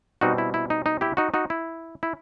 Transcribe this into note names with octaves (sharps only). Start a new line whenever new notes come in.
B2 G3 C4 D#4 F#4
E4
E4
D#4
D#4
E4 G4
D#4 F#4
D#4 F#4
E4
E4